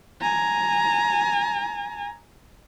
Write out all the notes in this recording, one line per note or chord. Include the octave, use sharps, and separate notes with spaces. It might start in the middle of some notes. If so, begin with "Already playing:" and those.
G#5 A#5